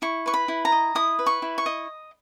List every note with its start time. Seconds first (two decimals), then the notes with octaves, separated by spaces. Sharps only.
0.02 E4 C#6
0.26 B4 C#6
0.34 B5
0.48 E4
0.65 A#5
0.72 D#5
0.95 E4 D#6
1.19 B4
1.26 C#6
1.42 E4
1.58 C#6
1.66 D#5